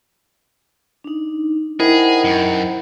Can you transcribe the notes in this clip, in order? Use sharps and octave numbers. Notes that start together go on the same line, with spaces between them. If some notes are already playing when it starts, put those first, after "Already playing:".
D4 D#4
D#3 E4 G#4 C5 F#5
F#2